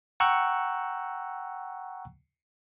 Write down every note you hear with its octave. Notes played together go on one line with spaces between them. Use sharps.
F#5 G5 A#5 C#6 E6 F#6